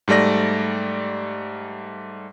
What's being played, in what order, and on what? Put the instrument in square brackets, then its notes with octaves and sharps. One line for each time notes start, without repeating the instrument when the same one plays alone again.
[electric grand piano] G#2 G3 A3 D5 A#6